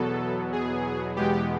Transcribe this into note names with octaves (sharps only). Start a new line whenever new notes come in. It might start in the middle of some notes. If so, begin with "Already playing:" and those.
Already playing: E2 B2 F#3 B3 A4
G#4
E2 B2 G#3 B3 G4